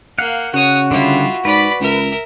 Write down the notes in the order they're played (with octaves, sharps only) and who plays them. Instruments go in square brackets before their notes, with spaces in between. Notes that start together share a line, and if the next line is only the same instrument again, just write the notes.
[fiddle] A#3 [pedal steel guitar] F5 F#5
[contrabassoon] C#3 [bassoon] F#4 [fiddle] C#5 D#6 [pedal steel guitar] F#5
[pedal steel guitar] D3 G3 [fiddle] E4 F4
[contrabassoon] G#2 [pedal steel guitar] B4 [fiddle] D5 B5
[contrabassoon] C#2 [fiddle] A#4 E5